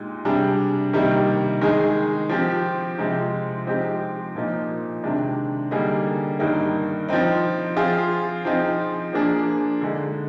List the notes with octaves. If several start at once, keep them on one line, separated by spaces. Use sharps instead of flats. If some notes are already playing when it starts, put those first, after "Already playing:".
Already playing: A#2 G#3 D#4 G4
C3 G3 D4 G#4
C3 D#3 G3 A#3 D#4
D#3 G#3 D#4 G#4
F3 C4 G4
C3 F3 G#3 C4
F3 G#3 C4 D#4 G4
A#2 F3 A#3 D#4
C3 D#3 G#3 D4
D3 G3 A#3 D#4 G#4
G2 D#3 A#3 D#4
F3 C4 D#4
F3 C4 F4 G#4
F3 C4 D#4 G#4
F3 A#3 D4 G#4
D3 G#3 D#4